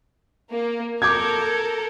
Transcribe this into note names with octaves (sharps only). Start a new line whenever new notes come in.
A#3
A4 A#4 D6 G6 G#6